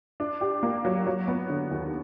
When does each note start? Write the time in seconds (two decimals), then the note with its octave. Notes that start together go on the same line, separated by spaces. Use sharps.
0.20 D4
0.41 G4
0.63 A#3
0.85 F#3
1.07 F#3
1.28 B3
1.50 D3
1.71 D#2